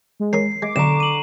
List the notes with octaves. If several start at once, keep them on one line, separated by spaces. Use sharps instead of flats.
G#3
C#4 A#4 D#6 C7
G#3 D6
B1 D3 A#5 C#6 D6 E7
D#7 F#7